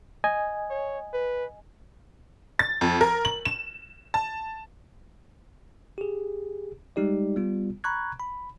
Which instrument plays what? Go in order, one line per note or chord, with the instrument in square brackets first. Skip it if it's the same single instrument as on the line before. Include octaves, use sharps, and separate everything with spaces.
[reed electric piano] D#5 G#5
[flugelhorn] C#5
B4
[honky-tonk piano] A6
F2
A#4
F#7
E7
A5
[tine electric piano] G4 G#4
G3 G#3 D#4 G4 D5
G3 B3 F4
A#5 B5 C#6 F#6 G#6
B5